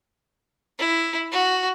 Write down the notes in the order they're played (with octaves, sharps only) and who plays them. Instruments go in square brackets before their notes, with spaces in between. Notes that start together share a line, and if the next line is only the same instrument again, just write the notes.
[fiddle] E4
F#4